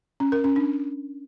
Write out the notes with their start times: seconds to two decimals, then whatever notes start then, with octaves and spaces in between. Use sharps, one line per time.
0.20 C#4
0.32 A#4
0.44 C#4
0.56 D4